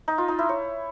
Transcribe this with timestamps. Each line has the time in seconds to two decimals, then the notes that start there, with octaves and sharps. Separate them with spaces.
0.08 D#4
0.18 F4
0.28 D#4
0.39 E4
0.49 C#5